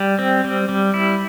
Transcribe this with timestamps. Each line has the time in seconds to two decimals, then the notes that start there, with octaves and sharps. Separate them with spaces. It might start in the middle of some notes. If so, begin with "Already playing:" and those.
Already playing: G3
0.19 C4
0.44 G3
0.69 G3
0.94 E4